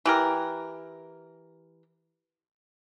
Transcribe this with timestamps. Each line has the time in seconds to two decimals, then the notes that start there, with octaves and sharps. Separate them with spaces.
0.06 E3 G4 A#4